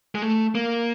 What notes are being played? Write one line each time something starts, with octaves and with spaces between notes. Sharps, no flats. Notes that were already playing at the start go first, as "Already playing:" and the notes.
G#3
A3
A#3